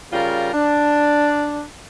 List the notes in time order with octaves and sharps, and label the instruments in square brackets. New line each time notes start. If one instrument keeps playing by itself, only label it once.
[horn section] C#3 G3 F4 A#4
D4